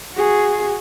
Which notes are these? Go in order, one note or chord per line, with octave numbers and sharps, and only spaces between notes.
F#4 G#4